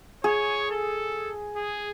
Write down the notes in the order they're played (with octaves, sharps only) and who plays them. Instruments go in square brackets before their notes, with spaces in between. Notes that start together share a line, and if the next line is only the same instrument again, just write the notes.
[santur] G#4 [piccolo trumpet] C#5
[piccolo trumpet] A4
G#4